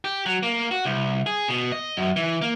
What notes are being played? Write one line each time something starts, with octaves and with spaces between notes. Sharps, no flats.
G4
F#3
A#3
F#4
C2
G#4
B2
D#5
F#2
E3
A#3